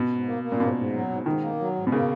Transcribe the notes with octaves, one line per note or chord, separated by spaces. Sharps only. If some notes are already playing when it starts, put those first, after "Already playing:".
Already playing: B2
G#2
A#3
A#3
A#2
G#2 B2
G#2
F#3
G#2
G#2 D#3
A#3
F#3
G#2
B2
C#3 A#3